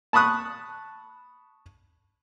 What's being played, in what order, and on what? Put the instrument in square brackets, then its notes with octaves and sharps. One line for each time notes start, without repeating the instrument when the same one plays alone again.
[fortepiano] A5 B5 C#6 D#6 F#6